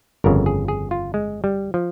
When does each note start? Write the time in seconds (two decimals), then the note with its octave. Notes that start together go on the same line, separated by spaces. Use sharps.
0.24 G1 F2 C#3 A#4
0.46 G#4
0.68 G#4
0.91 F4
1.14 G#3
1.44 G3
1.74 F3